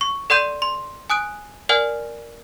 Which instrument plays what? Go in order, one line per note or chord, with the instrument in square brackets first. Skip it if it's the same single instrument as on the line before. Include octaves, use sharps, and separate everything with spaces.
[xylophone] C#6
A4 D5 F#5 C6 G6 D#7
C6
G#5 D#6 F#6 D7
A#4 D5 F#5 G#5 F6 G7